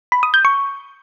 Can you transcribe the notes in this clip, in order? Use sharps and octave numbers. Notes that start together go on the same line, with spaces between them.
B5
D#6
G6
C#6